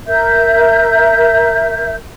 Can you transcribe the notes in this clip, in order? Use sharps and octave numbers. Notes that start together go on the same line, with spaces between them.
A#4 E5 G6